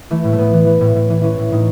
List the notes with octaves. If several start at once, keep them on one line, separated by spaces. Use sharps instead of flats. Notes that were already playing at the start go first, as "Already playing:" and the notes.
E3 A3
A2
A3
A2 B3
E3
E3
A2
A2
E3
E3 C#4
A2
A2 D#4